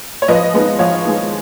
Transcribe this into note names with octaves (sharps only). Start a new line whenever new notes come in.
C#5
F3 B4 D#5
G#3 B3 D#4
F3 C#5 F5
G#3 B3 D#4